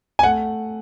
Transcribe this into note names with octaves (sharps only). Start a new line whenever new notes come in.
G#5
A3 F#5